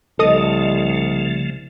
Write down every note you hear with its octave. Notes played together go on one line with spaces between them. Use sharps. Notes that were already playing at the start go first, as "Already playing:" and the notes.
C2 C#3 F3 A3 A4 D#5 D#6